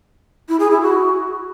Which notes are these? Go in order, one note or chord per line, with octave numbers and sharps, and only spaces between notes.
E4
G#4
E4
F#4